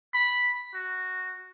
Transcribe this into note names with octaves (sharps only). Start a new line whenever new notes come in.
B5
F#4